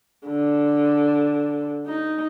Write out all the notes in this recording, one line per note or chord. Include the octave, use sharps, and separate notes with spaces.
D3
D#4